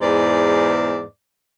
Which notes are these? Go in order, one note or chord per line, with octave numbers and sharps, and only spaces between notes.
E2 G#2 D5